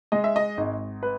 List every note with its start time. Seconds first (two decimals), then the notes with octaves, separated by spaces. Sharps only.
0.12 G#3 D#5
0.24 E5
0.36 D#5
0.57 G#1
1.03 B4